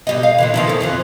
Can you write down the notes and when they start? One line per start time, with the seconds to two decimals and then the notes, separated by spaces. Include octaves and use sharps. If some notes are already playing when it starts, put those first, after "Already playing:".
0.07 B2 G3 D#5
0.23 F5
0.38 A#2 D3 E3
0.54 D#3 F3 E4
0.67 C#4 A4
0.81 F2 E3 F3